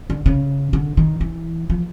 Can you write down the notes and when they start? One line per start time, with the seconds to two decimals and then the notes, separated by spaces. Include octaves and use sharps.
0.10 D3
0.26 C#3
0.73 D3
0.97 D#3
1.21 E3
1.70 F3